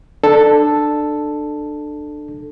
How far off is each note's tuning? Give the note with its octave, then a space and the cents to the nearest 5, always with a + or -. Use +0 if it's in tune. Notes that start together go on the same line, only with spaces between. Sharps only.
D4 +25 A4 +0